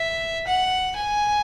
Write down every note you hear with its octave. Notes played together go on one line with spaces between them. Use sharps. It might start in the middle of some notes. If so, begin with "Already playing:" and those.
Already playing: E5
F#5
G#5